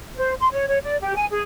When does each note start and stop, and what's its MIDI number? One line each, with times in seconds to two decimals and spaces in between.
0.16 0.33 72
0.39 0.48 84
0.52 0.65 73
0.67 0.78 73
0.83 0.96 74
1.00 1.13 67
1.15 1.25 80
1.30 1.41 68